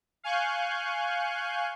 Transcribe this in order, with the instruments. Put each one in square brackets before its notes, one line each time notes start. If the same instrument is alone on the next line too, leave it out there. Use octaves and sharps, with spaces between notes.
[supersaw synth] F5 G#5 C#6 F#6 G6